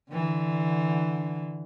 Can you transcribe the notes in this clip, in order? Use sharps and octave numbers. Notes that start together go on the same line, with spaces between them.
D3 E3